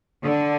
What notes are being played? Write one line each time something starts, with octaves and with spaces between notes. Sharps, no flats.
D3